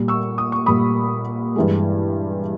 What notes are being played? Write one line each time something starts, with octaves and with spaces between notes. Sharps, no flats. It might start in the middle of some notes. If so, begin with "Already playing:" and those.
Already playing: A#2 G3
C#6 E6
D#6
C#6
A#2 G3 B5 D#6
G2 E3 G#3